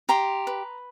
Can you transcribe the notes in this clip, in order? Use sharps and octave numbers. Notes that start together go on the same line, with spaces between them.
G4 A#5 C6
B4